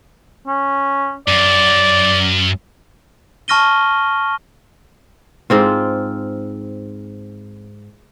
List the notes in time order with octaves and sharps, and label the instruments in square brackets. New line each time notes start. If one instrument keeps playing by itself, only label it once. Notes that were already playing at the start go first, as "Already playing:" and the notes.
[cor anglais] C#4
[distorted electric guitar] F#2 [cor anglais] D5
[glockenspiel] A5 C#6 F6 A#6 D#7 G7
[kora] G#2 C4 F4